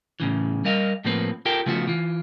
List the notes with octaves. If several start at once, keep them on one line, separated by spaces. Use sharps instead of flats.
A2 C#3 E3
G3 A#4 D#5 F5
A2 F3 A3 A#3 C4 B4
F4 G4 A4 A#4 G5
C#3 F3 A3 B3 F4 F#4
E3 F4